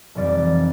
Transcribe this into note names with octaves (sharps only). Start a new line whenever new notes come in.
F1 F2 E3 G3 D5